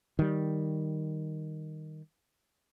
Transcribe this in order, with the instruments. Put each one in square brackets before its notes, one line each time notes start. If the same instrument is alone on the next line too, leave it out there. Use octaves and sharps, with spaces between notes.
[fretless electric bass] D#3 G3